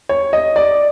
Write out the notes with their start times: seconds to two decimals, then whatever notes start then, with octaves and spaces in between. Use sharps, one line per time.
0.09 C#5
0.33 D#5
0.56 D5